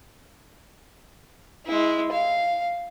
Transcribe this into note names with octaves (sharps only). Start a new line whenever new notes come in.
G#3 E4
F5